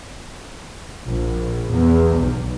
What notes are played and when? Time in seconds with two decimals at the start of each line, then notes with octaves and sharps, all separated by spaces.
1.06 A#1
1.69 E2
2.14 B1